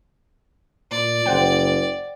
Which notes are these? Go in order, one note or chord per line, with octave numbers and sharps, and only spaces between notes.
A#2 D5
F#1 C5 F#5 G5